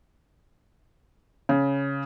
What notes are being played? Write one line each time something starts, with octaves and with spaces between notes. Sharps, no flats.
C#3